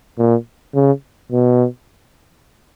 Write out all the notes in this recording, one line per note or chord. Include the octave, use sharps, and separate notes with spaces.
A#2
C#3
B2